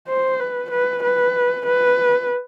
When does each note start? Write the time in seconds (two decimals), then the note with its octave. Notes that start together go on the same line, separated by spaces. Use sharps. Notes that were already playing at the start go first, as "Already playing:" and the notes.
0.08 C5
0.40 B4
0.71 B4
1.04 B4
1.67 B4